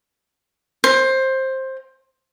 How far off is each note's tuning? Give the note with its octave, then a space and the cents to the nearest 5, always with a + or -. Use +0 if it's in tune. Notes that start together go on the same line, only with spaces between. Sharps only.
C5 +15